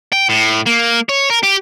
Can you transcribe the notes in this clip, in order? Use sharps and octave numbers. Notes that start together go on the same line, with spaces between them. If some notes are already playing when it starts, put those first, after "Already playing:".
G5
A2
A#3
C#5
A#4
G4